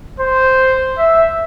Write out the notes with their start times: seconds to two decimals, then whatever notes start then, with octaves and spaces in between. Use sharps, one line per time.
0.20 C5
0.98 E5